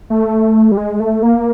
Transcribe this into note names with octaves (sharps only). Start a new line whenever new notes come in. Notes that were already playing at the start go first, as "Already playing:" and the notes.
A3
G3
G#3
A3
A#3